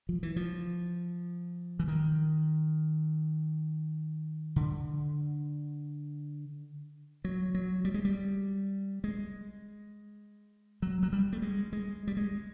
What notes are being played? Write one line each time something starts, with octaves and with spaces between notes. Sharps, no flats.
F3
E3
F3
E3
D#3
D3
F#3
F#3
G3
G#3
G3
G#3
F#3
F#3
G3
A3
G#3
G#3
G3
G#3